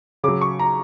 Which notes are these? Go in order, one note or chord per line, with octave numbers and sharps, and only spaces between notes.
C#3 F#3 D6
C#6
A#5